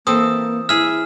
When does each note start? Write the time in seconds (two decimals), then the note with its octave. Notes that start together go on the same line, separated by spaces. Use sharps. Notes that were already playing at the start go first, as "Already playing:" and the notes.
0.07 E3 A#3 C4 A4 D#6
0.69 E4 G#4 E5 F6